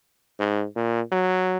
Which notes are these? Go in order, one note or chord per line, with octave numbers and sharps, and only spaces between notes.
G#2
A#2
F#3